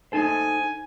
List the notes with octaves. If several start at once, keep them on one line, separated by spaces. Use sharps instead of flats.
D#4 A4 C5 G#5